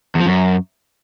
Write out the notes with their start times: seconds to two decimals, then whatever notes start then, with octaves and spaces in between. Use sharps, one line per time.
0.15 E2
0.20 F3
0.26 F#2